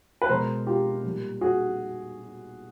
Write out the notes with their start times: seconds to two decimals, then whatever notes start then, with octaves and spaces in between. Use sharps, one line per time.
0.22 B4
0.29 B2 G#3 A#4 C5
0.67 F4 G4
1.04 A#2 G3
1.41 F#4 G#4